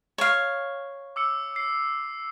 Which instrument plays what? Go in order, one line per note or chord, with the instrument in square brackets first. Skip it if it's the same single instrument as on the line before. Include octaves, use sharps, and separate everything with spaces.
[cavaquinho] C#5 F5
[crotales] D6 E6 C#7
C7